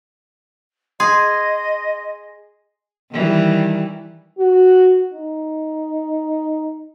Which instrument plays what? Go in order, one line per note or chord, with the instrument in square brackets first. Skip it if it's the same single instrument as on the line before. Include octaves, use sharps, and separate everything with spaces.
[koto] G#4 [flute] D#5 [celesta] C6
[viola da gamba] D#3 E3 G3
[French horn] F#4
D#4